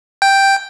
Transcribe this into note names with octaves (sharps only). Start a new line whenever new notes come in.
G5